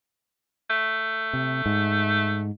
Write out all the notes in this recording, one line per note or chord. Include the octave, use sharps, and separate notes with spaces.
A3
C3
G#2